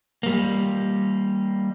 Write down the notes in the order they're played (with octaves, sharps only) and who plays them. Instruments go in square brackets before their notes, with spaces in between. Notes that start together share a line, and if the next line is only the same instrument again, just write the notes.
[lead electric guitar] G3 A#3